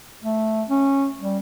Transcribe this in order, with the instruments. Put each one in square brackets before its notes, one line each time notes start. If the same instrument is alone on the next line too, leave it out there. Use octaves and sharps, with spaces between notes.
[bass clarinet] A3
C#4
G3